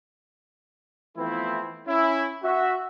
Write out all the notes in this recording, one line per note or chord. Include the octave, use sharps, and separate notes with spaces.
E3 F3 A3 B3 C4 E4
C#4 E4
F#4 E5